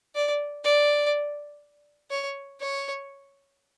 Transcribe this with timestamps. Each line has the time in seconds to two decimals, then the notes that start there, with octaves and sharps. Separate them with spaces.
0.15 D5
0.64 D5
2.11 C#5
2.60 C#5